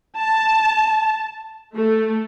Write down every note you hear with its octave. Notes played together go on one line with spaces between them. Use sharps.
A5
A3